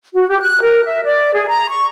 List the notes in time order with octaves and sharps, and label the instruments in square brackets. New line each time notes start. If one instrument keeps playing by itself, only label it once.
[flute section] F#4
G4
F#6
A#4
E5
D5
G#4
A#5
C#6